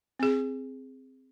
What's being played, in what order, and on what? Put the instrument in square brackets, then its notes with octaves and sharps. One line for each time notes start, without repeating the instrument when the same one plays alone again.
[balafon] C4 G#4